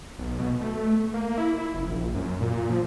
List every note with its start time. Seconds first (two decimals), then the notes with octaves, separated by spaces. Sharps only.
0.19 B1
0.39 B2
0.61 A3
1.14 A#3
1.38 E4
1.58 E4
1.74 F#1
1.88 A#1
2.14 F#2
2.41 A#2
2.70 F3